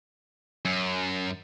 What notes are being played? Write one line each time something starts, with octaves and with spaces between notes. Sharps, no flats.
F#2